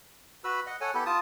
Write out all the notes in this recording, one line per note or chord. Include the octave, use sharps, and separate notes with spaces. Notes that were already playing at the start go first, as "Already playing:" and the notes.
F#4 B4 B5 E6
D#5 F#5
A4 C#5 F#5 G#5
B3 E4 G4 A4
F4 A5 D#6